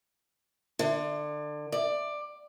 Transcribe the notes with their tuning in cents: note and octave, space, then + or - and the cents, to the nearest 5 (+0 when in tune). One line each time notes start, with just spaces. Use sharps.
D3 +25
D5 +15